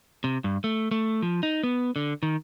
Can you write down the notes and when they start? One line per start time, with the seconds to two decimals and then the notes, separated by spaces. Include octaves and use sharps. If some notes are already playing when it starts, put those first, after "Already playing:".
0.24 C3
0.44 G2
0.64 A3
0.91 A3
1.22 F3
1.43 D#4
1.63 B3
1.96 D3
2.23 D#3